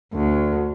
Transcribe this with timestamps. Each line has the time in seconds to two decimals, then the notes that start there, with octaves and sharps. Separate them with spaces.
0.13 D2